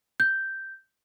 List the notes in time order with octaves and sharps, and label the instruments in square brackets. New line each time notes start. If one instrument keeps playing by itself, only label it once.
[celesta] G6